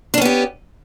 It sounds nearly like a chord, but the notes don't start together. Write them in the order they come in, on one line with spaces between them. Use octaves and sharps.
D4 C#4 B3 G4